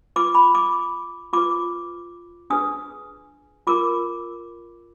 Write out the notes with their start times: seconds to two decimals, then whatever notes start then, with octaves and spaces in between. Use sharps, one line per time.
0.16 F4 B4 D6
0.35 B5
0.55 D6
1.33 F4 B4 D6
2.50 D4 G#4 B4 D#6
3.67 F4 A#4 D6